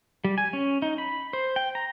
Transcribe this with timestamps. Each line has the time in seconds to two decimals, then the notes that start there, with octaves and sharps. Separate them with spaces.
0.24 G3
0.38 G#5
0.53 C#4
0.82 D#4
0.98 B5
1.33 C5
1.56 G5
1.75 A#5